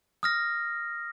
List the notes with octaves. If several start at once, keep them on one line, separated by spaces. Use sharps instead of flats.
D#6 F6 A#6